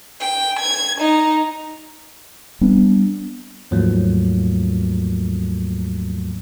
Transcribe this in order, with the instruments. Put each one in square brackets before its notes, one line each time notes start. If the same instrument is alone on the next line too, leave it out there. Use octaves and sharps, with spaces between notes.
[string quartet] G5
G#6
D#4
[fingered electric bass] G3 B3 C4 D4
[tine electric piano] D#2 G#2 F3 F#3 A3 A#3